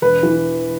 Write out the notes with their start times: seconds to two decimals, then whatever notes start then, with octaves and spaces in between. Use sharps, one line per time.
0.02 E1 B4
0.23 E3